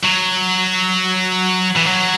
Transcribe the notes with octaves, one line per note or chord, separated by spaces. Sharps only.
F#3
E3
F#3